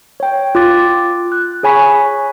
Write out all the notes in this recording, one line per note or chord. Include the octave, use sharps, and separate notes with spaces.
C#5 G5
F4 D6 A6
F#6
G#4 C#5 G#5 B5 C#6 B6